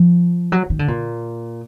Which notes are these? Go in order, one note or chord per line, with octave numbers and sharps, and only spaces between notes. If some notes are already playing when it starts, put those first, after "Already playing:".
Already playing: F3
F#3
D#3
D3
A#2